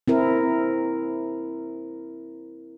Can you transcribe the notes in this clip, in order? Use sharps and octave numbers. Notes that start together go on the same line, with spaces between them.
C4 E4 A#4